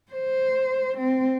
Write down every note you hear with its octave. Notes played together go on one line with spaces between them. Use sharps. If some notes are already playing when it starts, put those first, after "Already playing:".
C5
C4